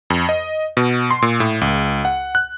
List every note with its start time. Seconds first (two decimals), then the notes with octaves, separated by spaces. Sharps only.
0.10 F2
0.29 D#5
0.77 B2
1.11 C6
1.22 A#2
1.40 A2
1.61 C#2
2.05 F#5
2.35 F#6